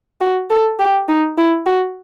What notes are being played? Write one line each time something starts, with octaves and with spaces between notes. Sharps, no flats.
F#4
A4
G4
D#4
E4
F#4